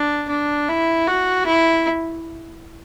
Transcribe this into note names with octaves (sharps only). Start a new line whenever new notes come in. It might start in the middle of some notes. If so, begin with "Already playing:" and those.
Already playing: D4
D4
E4
F#4
E4